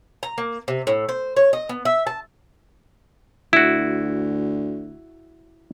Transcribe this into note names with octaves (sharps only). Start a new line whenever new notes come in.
A#5
A#3
C3
A2
C5
C#5
D#5
B3
E5
A5
D2 E4 F#4